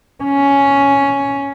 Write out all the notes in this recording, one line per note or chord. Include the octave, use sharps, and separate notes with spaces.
C#4